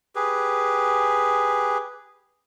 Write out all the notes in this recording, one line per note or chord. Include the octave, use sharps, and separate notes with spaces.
G4 G#4 B4